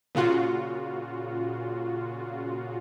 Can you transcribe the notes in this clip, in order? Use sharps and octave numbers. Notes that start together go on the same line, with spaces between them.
A#2 C#3 F4 F#4